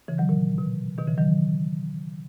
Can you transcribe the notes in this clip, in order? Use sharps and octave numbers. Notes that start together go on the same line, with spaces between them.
C#3 E3
D#3 F#3
A#2
B2
B2 D#3
C#3 E3
D#3 F#3